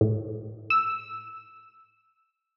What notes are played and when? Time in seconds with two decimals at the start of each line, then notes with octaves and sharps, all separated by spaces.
0.01 A2
0.70 E6